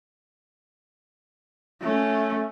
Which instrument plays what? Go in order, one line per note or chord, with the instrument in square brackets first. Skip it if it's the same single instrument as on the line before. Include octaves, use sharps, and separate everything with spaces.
[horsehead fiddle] A3 C#4